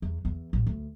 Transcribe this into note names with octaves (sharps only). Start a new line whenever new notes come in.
E2
E2
A1
D2